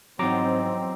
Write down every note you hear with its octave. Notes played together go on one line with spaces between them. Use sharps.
E2 G#2 F3 F#3 C4 D#4 A#5 D6